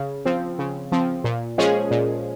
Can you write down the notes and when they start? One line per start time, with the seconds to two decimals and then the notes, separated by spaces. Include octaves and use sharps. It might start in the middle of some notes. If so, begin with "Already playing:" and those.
Already playing: C#3
0.25 F3 C4
0.59 C#3
0.92 F3 C4
1.24 A#2
1.58 F3 G#3 C#4 G#4
1.91 A#2